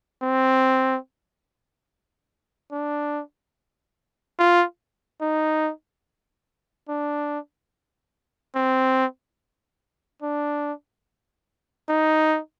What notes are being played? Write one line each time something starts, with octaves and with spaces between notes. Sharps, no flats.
C4
D4
F4
D#4
D4
C4
D4
D#4